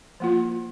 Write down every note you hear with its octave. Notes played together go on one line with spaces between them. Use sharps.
F3 A#3 F4